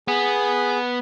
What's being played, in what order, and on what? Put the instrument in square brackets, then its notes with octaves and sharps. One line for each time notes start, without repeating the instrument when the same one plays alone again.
[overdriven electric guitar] B3 [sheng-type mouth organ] G#4